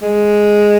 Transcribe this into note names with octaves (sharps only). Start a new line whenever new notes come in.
G#3